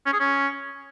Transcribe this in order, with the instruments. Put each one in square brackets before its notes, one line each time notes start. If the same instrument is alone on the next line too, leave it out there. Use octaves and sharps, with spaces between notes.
[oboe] C#4
G#4
C#4